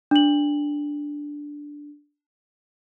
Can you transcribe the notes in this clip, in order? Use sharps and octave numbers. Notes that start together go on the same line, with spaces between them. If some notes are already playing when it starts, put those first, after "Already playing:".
D4 F#7